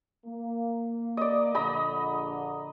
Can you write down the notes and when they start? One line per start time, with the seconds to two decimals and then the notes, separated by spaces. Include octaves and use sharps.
0.26 A#3
1.17 D5 D#5
1.55 A#1 D3 D#5 A#5 B5